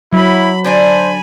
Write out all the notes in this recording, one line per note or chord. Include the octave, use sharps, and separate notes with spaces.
F#3 E4 B5
D3 D4 C5 D5 G#5 B5